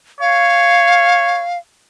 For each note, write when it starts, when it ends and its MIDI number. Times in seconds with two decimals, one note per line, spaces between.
0.21 1.43 73
0.21 1.58 77